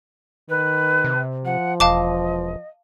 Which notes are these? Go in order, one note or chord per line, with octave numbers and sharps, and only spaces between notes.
D#3 B4
C3
F3 F#5
E1 D#5 F5 A5 D6